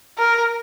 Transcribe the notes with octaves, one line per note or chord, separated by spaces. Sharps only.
A#4